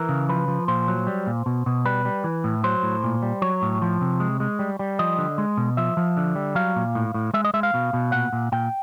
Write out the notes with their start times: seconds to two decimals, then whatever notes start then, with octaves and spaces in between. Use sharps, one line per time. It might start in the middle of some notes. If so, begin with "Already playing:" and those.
Already playing: E3 A#4
0.09 C#3
0.29 F3 B4
0.48 F3
0.68 A#2 C5
0.88 F#3
1.07 G3
1.27 A#2
1.46 B2
1.66 B2
1.85 G3 B4
2.05 G3
2.24 E3
2.44 A2
2.64 F#3 C5
2.83 A2
3.04 A#2
3.22 G3
3.42 F#3 C#5
3.62 A2
3.82 F3
4.01 C3
4.20 G#3
4.40 G#3
4.59 G3
4.79 G3
4.99 F3 D#5
5.18 D3
5.38 G#3
5.57 B2
5.77 F3 E5
5.97 F3
6.17 D3
6.36 G3
6.55 F#3 F5
6.76 A#2
6.95 A2
7.14 A2
7.34 G#3 E5
7.44 D#5
7.54 G#3 E5
7.63 F5
7.74 B2
7.93 B2
8.12 A#2 F#5
8.33 A#2
8.52 A#2 G5